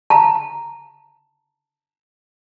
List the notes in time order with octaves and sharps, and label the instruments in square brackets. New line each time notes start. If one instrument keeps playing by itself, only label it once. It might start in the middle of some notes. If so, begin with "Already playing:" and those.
[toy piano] A5 A#5